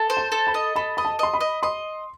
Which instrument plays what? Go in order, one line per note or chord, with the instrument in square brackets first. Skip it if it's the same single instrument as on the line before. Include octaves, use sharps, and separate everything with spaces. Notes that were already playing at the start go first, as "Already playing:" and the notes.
Already playing: [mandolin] A4
C5
[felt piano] A5
[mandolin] A4
[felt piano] B5
[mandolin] D#5
[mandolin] A4 [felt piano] B5
[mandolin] D#5 [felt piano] B5
[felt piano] A5
[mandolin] D#5 [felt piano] C6
[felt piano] B5
[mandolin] D#5
[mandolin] D#5 [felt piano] C6